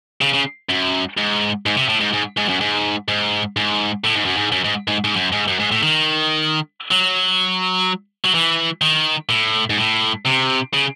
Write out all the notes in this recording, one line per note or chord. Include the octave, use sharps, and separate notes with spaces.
C#3
C#3
F#2
G#2
G#2
C3
A2
G#2
G#2
G#2
F#2
G#2
G#2
G#2
A2
G#2
F#2
G#2
F#2
G#2
G#2
G#2
F#2
G#2
F#2
G#2
A2
D#3
F#3
F#3
E3
D#3
A2
G#2
A2
C3
C#3